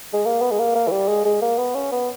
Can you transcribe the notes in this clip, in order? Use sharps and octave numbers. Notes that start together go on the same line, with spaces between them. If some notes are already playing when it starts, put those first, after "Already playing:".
G#3
A#3
B3
G#3
A#3
A#3
E3
G3
G#3
G#3
A#3
B3
C#4
B3